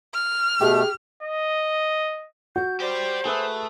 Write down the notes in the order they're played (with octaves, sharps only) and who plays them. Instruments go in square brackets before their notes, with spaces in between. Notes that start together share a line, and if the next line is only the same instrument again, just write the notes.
[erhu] F6
[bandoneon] B2 A3 [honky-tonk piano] G4 [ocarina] G#4
[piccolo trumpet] D#5
[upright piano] F#4 [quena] G6
[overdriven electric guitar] G4 D5 [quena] C5
[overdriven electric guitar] A3 [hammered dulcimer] G#4 B4 E5